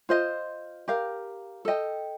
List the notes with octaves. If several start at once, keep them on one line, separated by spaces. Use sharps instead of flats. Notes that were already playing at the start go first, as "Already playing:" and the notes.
F4 C5 D#5
G4 A#4 F5
A4 D#5 G5